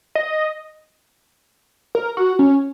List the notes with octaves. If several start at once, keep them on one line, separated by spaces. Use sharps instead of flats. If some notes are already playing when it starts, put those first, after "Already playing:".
D#5
A#4
F#4
C#4